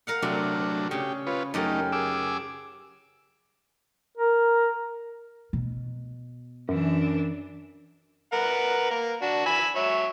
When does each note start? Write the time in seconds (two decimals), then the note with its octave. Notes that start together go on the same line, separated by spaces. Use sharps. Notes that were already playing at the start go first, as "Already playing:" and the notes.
0.07 A#4 F5 F#5
0.22 C3 F#3 A3 D4
0.91 C#3 G4
1.27 F4 B4 C#5
1.54 F#2 A3 D#4 G4 A#4
1.92 G#4 D6 E6
4.17 A#4
5.53 B2
6.69 F#2 E3 D4
8.33 A#4 B4 F#5
8.91 A#3 A#4
9.22 D4 F#4
9.46 G#5 B5 E6
9.76 F#3 C#5 E5